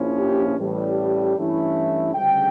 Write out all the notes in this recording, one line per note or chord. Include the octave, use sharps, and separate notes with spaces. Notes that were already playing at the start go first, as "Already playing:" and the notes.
Already playing: A#1 A#2 F3 C#4 E4
G4
A1 A2 G3
G2 E3 A3 C#4 E4
D2 C#3 G3 G5